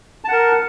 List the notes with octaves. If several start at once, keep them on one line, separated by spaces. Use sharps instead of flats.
A#4 F#5 A5